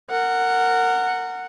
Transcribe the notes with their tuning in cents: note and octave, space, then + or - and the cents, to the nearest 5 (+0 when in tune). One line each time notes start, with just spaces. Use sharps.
A#4 -25 F#5 +0